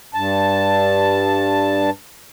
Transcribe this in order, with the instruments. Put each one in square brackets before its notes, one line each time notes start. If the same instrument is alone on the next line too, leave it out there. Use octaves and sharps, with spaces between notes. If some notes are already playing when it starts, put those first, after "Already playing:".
[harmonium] G2 A5